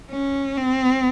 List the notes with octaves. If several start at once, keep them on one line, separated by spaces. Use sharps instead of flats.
C#4
C4